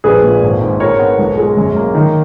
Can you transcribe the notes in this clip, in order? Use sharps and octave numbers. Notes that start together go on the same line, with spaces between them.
A#1 G#4 B4
A#2
G#1
G#2
G#3 A#4 C#5
B3
B1
G#3
F#2
A#3
D#3